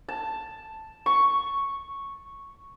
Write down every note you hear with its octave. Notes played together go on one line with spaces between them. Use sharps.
A5
C#6